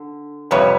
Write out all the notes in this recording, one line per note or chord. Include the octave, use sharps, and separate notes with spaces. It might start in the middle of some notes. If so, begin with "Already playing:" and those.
Already playing: D3
F2 C3 G3 B4 C#5